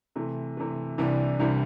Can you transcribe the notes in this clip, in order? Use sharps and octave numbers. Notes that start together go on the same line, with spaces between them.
C3 E3 A3
C3 E3 A3
C2 C3 E3 G3 D4
C2 C3 E3 G3 D4